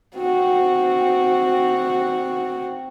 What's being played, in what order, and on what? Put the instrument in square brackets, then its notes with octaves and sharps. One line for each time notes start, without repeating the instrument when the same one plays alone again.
[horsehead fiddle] C4 F#4